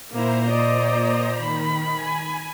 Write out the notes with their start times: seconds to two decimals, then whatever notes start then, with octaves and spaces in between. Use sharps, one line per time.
0.12 A#2 A#3 E4 C5 A#5
0.49 D5 D#5
1.39 D#3 B5
1.94 G#5